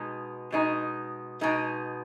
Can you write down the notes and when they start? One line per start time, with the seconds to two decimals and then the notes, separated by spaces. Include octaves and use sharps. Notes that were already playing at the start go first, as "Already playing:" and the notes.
Already playing: B2 G#3 D#4
0.52 B2 G#3 D#4
1.41 B2 G#3 D#4